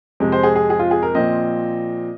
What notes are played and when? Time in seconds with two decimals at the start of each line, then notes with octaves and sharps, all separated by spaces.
0.20 F2 C3 G#3
0.32 C5
0.43 G#4
0.56 G#4
0.70 G#4
0.79 F4
0.91 G#4
1.02 A#4
1.15 A#2 F3 C4 D#5